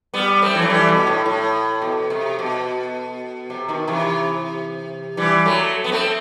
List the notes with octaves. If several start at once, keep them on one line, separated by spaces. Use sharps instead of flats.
G3 B3
A3 C4
E3
F#3
E3 G3
B2
A2
A2
B2
C3
B2
C3
B2 D#3
C3 E3
E3 G3
F#3 A3
B3
A3 C4